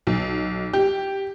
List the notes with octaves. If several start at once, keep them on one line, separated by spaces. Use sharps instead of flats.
B1
G4